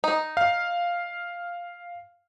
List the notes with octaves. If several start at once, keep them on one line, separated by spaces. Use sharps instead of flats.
D#4
F5